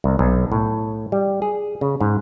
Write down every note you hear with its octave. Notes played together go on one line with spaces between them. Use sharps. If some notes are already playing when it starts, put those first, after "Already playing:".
C2
B1
A2
G3
G#4
C#3
G#2